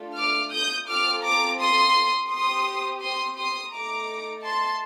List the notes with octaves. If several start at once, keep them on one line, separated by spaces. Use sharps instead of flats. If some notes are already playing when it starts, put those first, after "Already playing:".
Already playing: A3 D4 F4 A4
D6 F6
D#6 G6
C4 F4 A4 D6 F6
A#5 D6
C6 D#6
C4 G4 C6 D#6
C6 D#6
C6 D#6
A3 D#4 A4 A#5 D6
A5 C6